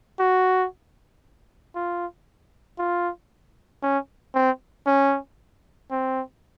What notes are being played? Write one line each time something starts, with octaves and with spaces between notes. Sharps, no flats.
F#4
F4
F4
C#4
C4
C#4
C4